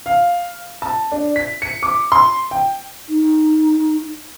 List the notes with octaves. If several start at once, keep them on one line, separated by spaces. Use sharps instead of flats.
F5
A5
D4
B6
C#7
D6
C6
G5
D#4